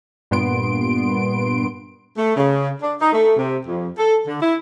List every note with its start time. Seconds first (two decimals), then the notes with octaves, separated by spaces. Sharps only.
0.31 G2 A#2 B3 C6 D7
2.17 A3
2.37 C#3
2.81 D4
3.00 D#4
3.12 A3
3.37 C3
3.67 F2
3.98 A4
4.27 D3
4.42 E4